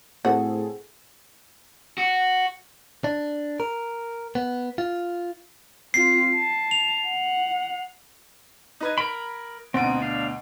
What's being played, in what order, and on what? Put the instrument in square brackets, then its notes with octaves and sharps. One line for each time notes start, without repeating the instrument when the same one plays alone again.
[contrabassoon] A2 [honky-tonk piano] C4 G#4 A4 [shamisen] F#4
[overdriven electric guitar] F#4
[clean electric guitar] D4
A#4
B3
F4
[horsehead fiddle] C4 F4 [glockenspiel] C7
[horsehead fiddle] A5
[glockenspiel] F7
[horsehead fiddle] F#5
[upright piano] D#4 B4 G#6
[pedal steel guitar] A#4 B5 [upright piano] D7
[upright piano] D2 B2 D7 [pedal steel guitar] C4 D#4
[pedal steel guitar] D4 F5